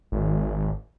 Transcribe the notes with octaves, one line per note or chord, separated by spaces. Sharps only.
G#1